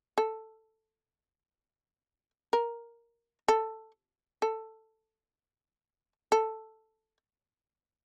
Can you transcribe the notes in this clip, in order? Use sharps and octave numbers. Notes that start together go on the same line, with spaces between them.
A4
A#4
A4
A4
A4